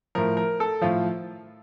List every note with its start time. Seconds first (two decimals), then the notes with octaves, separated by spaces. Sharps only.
0.15 A2 F3 A#4
0.37 A#4
0.60 A4
0.81 A2 F3 F4